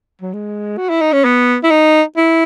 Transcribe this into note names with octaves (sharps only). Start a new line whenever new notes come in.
F#3
G#3
F#4
E4
D#4
C#4
B3
E4
D#4
E4